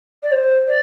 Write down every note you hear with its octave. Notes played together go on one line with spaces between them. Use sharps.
D5
C5
D5